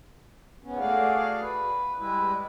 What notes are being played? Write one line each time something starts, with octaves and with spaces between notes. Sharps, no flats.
G#2 B3 C#4
A3 F#4 G#4 D5 F5
B4
G3 G#3 E4 B4